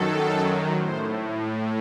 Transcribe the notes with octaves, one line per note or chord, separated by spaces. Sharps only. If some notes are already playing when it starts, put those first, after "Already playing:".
Already playing: F#2 D#3 F#3 A4
A2 C5